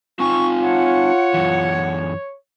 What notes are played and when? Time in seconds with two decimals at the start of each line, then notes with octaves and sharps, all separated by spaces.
0.20 C4 D#4 F4 G#5 C#6
0.63 C#5 F#5
1.34 F#2 E3